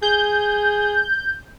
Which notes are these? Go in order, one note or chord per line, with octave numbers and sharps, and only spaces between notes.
G#4 G6